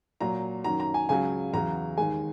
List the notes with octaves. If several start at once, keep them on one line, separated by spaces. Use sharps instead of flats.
A#2 F#3 A#5
F#2 D#3 F#3 A#5
A#5
G#5
C#2 C#3 F#3 G#5
E2 C#3 F#3 A#5
D#2 D#3 G#3 G#5